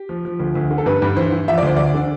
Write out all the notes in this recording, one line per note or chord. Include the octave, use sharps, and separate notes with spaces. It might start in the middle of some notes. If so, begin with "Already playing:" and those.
Already playing: G4
F3
F3
D2
D2
D3
A4
G2 B4
G2
E3 C5
E3
F3 E5
D5
D2 C5
D2 D5
D3